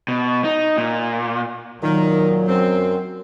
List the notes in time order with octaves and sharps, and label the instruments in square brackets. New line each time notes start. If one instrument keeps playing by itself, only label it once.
[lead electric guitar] B2
D#4
A#2
[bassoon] A#2 [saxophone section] D#3 [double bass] F#3
[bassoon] F#2 [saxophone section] C4